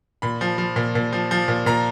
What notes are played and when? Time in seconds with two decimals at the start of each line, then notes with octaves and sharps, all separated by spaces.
0.22 A#2 B5
0.41 F3
0.58 F3
0.76 A#2
0.95 A#2
1.12 F3
1.31 F3
1.48 A#2
1.66 A#2 A#5